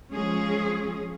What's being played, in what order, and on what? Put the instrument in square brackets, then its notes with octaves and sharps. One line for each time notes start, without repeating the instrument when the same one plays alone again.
[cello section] F3 G#3 C#4 G#4